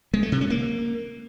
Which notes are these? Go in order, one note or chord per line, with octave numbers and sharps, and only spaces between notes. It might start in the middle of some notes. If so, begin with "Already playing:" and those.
G#3
A3
C3
C#4
A#3